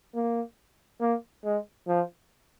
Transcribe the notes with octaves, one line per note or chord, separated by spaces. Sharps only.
A#3
A#3
G#3
F3